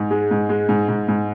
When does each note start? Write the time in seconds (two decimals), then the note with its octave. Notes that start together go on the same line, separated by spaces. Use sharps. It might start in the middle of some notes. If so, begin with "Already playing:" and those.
Already playing: G#2
0.11 G#3
0.31 G#2
0.49 G#3
0.69 G#2
0.88 G#2
1.08 G#2